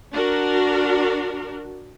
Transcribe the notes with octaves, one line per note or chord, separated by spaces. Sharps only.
D4 F#4 A#4